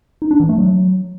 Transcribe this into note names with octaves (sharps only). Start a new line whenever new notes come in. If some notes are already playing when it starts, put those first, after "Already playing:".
D#4
D4
E3
A3
F#3